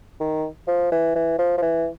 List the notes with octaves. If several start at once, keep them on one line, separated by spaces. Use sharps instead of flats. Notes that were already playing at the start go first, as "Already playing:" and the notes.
D#3
F3
E3
E3
F3
F3
E3